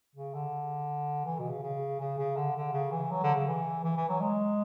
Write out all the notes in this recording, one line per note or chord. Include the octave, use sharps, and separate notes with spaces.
C#3
D3
E3
B2
C#3
C#3
C#3
C#3
D3
D3
C#3
E3
F#3
D3
C#3
E3
E3
E3
F#3
G#3